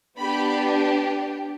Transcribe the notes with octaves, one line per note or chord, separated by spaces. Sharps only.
B3 D4 G4 B5